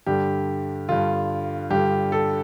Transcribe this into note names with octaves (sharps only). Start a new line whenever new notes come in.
G2 D3 G4
G2 D3 F4
G2 D3 G4
A4